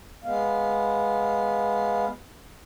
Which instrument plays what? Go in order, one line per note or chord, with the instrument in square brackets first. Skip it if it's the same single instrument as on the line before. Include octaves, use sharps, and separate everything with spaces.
[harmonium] G#3 B3 F5